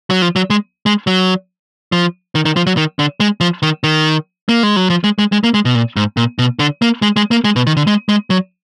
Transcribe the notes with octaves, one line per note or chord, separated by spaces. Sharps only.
F#3
F3
F#3
G#3
G#3
F#3
F3
D#3
D#3
F3
F#3
D#3
D3
G#3
F3
D#3
D#3
A#3
G#3
F#3
F3
G#3
G#3
G#3
A#3
G#3
B2
A#2
G#2
A#2
B2
D3
A#3
G#3
G#3
A#3
G#3
B2
D#3
D3
G#3
G#3
F#3